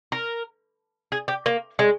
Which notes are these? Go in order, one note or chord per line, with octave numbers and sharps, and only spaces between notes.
A#4
G#4
G4
A#3
G#3